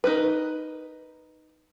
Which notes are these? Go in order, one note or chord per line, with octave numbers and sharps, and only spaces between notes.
D#4 A#4 B4